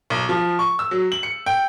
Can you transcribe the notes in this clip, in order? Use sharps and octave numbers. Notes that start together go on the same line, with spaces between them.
B1
F3
C#6
E6
F#3
F#7
C#7
G5